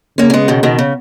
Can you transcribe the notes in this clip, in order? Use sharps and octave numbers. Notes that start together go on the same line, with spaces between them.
C#3 A#3 C#4
C#4
G#3 B3
B2 D#3
B2 D#3
C#3